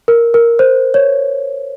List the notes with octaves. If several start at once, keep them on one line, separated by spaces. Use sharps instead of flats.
A#4
A#4
C5
C#5